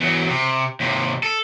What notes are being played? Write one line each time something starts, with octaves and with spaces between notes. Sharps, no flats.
E2 F#3
C3
D#2 C3
A4